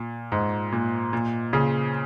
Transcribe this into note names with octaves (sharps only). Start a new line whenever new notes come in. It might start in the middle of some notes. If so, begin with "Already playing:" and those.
Already playing: A#2
G#2
A#2
A#2
A#2 C#3